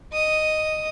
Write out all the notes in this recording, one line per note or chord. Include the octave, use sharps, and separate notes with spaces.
D#5 D#6